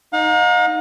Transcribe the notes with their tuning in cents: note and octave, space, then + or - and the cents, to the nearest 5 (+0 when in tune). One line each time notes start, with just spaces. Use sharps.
D#4 +0 F5 +45